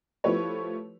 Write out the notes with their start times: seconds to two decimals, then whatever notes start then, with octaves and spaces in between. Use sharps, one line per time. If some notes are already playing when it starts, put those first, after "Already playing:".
0.24 F3 A3 E4 G4 B4 C#5